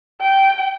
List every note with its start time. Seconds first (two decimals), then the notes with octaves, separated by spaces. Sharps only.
0.21 G5